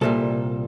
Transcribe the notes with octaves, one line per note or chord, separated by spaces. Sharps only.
C2 A#2 G3 A4